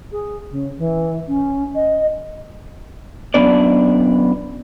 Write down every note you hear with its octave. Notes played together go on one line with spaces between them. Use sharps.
G#4
C#3
E3
C#4
D#5
F#2 D#3 B3 D4 D5